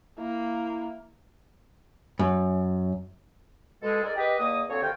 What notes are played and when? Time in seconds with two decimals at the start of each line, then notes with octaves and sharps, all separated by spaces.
0.18 A#3 E4
2.19 F#2
3.82 B2 G#3 A4
4.04 D#4 G#4 A#4 D5
4.16 G4 B4 D#5
4.39 E2 D#3 A#3 D#5 D#6
4.69 D2 F3 C4 C#5
4.82 D2 C3 D#3 F5 G5